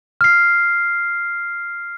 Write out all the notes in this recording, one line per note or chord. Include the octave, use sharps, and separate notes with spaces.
F6 C7